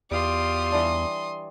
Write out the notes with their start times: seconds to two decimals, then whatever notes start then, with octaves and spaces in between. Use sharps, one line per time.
0.11 E2 F4 G4 D5 C6 D#6
0.72 E3 G3 D4